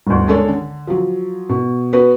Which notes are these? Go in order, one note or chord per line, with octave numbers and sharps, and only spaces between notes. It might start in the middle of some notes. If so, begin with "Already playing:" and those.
G1 D2
G#3 D4 A4 C#5
D3
F3 F#3
B2
B3 F#4 B4